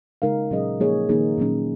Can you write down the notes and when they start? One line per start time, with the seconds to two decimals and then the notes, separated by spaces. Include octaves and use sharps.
0.22 C#3 G#3 D#4 A#4 F5
0.51 A#2 F#3 C#4 G#4 D#5
0.80 F3 A#3 D#4 G#4 C#5
1.09 D#3 A#3 D#4 G#4
1.38 A#2 F#3 A#3 C#4